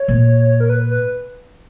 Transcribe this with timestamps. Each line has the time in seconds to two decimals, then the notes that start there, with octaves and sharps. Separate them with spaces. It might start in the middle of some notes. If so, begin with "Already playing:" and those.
Already playing: C#5
0.08 A#2
0.60 A#4
0.69 B4
0.90 B4